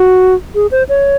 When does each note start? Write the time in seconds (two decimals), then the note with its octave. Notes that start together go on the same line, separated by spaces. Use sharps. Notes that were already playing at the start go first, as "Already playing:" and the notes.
Already playing: F#4
0.55 G#4
0.71 C5
0.89 C#5